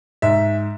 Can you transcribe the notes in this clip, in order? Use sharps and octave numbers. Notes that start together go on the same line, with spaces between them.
G#2 E5